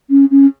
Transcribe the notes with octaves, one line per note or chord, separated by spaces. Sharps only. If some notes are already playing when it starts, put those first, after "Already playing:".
C#4
C#4